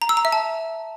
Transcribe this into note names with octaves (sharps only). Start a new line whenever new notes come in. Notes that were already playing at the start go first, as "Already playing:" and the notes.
A#5
E6
A#5
E5
A5